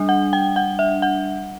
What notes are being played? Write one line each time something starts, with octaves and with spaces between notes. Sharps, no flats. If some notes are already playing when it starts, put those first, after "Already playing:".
Already playing: G3 D4
F#5
G5
F#5
E5
F#5